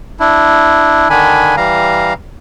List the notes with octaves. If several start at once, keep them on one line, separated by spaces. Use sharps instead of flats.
D4 E4
D3 D#3 D4 G#5 B5
E3 G3 F5 A#5